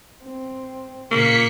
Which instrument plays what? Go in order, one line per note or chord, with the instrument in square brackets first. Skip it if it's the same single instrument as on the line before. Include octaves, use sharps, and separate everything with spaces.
[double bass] C4
[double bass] A#2 C#3 [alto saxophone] A#3 [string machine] B6 C#7